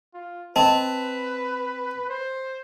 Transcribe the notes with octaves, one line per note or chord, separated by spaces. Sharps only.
F4
C4 B4 D#5 A5
C5